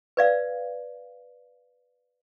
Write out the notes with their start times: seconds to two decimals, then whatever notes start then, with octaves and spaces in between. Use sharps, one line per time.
0.17 B4 D5 F5